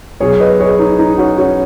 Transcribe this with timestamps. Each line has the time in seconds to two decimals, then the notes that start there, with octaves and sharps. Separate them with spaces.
0.20 B1 B2 G#4 C#5
0.40 B4 D#5
0.60 G#4 C#5
0.79 D#4
0.99 D#4
1.18 C#4 F#4
1.38 C#4 F#4